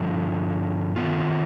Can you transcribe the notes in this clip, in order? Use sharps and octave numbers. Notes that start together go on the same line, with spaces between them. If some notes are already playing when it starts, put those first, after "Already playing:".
Already playing: G2 D3 F3
D#3 B3 F4